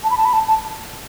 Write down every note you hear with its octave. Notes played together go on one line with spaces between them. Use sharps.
A5
B5
A5
B5
A5
A5